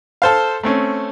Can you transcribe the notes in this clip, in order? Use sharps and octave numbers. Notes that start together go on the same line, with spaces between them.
A4 C5 F5
A3 C4 C#4